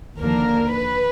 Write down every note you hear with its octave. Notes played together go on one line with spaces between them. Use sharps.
D#2 D3 F3 A#3 D4 A#4
B4